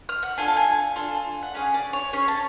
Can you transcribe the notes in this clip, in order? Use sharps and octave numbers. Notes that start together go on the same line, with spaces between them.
F6
F#5
D4 F4 A4 G#5
A5
G#5
D4 F4 A4
F#5
C#4 G#4 F5
D5
C#5
C#4 G#4 C#5
A5